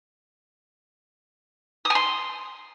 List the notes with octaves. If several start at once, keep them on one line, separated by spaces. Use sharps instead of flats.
D#6
G#5
C6